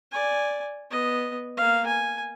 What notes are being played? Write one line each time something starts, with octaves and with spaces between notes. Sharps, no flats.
D5 G#5
B3 D#5
A#3 F5
G#5